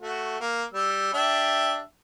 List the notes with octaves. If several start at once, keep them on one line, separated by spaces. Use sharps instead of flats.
A3 F#4
A#3
G3 E6
D4 G4 E5